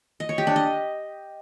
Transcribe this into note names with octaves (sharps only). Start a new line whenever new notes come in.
D#5
C#5
G4
D4
D#5